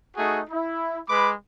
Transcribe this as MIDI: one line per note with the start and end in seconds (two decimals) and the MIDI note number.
0.17 0.40 57
0.17 0.40 63
0.17 0.40 66
0.17 0.40 68
0.50 0.98 64
1.09 1.31 56
1.09 1.31 71
1.09 1.31 83
1.09 1.31 86